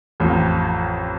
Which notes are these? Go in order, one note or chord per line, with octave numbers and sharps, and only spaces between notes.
A1 F2 F3